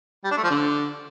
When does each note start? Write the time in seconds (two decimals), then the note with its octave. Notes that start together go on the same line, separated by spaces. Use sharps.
0.24 G3
0.31 D4
0.37 A3
0.44 F3
0.50 D3